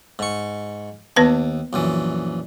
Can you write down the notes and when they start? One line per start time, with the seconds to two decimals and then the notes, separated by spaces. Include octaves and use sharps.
0.19 G#2 C#6
1.16 D#2 B3 B4 A5
1.73 A#1 F#2 E3